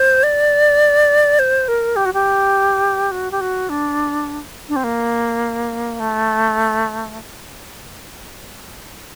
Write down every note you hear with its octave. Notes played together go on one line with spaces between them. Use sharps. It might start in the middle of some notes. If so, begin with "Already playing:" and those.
Already playing: C5
D5
C5
A#4
G4
F#4
G4
F#4
G4
F#4
D4
D4
C4
A#3
A3